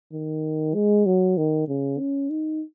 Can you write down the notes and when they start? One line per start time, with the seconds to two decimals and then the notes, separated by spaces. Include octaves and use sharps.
0.13 D#3
0.74 G#3
1.06 F#3
1.37 D#3
1.68 C#3
1.99 C#4
2.30 D#4